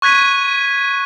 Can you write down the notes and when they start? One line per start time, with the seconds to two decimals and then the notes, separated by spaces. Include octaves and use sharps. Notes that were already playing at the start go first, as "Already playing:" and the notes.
0.02 C#6 F#6 G#6 B6 D#7